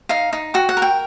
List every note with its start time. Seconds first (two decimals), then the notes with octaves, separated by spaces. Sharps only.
0.09 D#4 F5
0.33 D#4
0.54 F#4 G5
0.69 F#5
0.77 A#4
0.82 G5